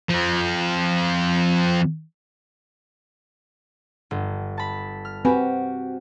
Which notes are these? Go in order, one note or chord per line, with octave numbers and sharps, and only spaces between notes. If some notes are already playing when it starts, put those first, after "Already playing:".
F3 C4
G1
A5 B5
F6
C4 F#4 G4 B4 G#5 B5